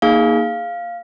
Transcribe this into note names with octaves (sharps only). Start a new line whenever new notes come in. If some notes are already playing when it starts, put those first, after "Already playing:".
A#3 D#4 G#4 F5